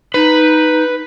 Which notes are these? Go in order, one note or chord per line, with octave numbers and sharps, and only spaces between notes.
D#4 B4